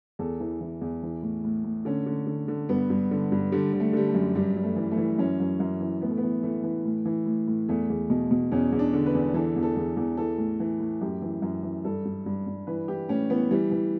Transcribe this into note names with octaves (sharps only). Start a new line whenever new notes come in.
E2 A4
E3
E3
E2
E3
A2
A2
A2
D3 C#4
D3
D3
D3
G2 B3
G2
D3
G2
D3 G3
D3
A3
D3 G3
A3
F#2
G2 G3
G2
A3
E3
A3
E3
F#2 C#4
F#2
F#2
E3
A2 B3
A3
B3
E3
E3 A3
E3
A2
E3
A2
A2
E2 A3
E2
B2
B2
E2 C#4
E2
D4
D3
B4
E2
E3 A4
E2
A4
E2
E2
E3 A4
A2
E3
A2
F#2 G4
E3
F#2
E3
G2 A4
G2
G2
G2
E3 B4
E3 G4
A2 C#4
E3 B3
E3 G3
E3